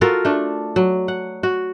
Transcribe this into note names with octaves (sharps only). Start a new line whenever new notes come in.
F4 F#4 A4 A#4
A3 D4
F#3
F#5
F#4